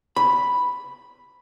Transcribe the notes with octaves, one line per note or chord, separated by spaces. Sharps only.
B5